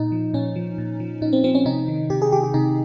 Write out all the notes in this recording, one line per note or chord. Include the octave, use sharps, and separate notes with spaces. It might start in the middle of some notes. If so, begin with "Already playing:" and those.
Already playing: A#2 D#4
F3
A#2 C#4
F3
A#2
F3
A#2 D#4
C4
F3 C4
C#4
C3 D#4
D#3
C3 G4
G#4
D#3 G4
G4
C3 D#4